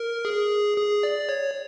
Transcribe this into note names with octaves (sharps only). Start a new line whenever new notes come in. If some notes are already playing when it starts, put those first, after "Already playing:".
Already playing: A#4
G#4
G#4
D5
C#5